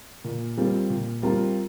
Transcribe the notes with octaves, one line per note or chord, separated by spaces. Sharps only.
A#2
G3 C4 F4 A#4
A#2
G3 C4 F4 A#4